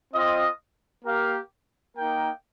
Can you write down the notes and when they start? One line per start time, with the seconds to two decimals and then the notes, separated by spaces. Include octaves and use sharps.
0.13 C4 F4 D#5
1.05 A#3 G4 A#4 F5
1.96 A#3 D#4 A#4 G5